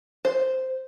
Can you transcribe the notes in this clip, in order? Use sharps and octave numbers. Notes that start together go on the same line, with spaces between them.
C5